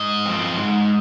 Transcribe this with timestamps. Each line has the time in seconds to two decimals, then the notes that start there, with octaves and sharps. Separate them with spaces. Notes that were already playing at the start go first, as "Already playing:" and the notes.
Already playing: G#2 D#5
0.25 F3 C4
0.57 G#2